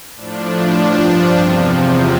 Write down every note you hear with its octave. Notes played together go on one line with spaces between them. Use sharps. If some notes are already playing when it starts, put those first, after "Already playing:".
A2 F3 D4
G2 F3
E2 C3 F3